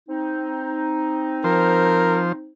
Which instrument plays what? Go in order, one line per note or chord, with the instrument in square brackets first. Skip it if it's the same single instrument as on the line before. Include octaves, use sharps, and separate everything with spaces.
[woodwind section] C4 D#4
[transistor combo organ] F3 C5 [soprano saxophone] A#4